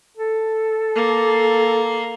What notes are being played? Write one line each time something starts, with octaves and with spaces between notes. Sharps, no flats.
A4
A#3